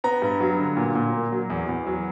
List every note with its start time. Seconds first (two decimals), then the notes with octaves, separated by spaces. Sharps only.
0.04 B3 A#5
0.22 G2
0.40 F#3
0.59 D3
0.77 A#2
0.95 A#2
1.13 A#3
1.32 F#3
1.50 E2
1.69 E2
1.87 F#3